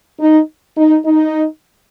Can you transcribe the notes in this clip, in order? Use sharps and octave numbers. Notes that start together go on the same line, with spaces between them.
D#4
D#4
D#4